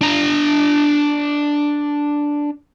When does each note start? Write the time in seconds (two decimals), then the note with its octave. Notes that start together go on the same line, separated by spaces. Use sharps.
0.01 D4 A#5